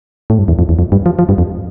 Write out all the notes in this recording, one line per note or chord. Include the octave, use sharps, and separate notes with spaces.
A2
G2
E2
F2
E2
F2
G2
F3
F3
G2
F2